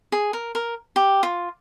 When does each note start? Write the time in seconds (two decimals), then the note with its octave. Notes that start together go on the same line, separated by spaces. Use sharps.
0.12 G#4
0.33 A#4
0.55 A#4
0.96 G4
1.23 F4